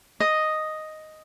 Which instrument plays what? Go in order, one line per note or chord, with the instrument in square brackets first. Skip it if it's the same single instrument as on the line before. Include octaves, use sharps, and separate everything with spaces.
[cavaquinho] D#5